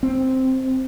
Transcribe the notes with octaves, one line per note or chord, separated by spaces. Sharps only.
C4